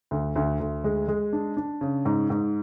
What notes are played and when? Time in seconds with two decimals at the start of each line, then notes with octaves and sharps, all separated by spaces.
0.11 D2
0.36 D2
0.60 D2
0.84 G#3
1.08 G#3
1.33 D4
1.57 D4
1.81 C#3
2.05 G#2
2.30 G#2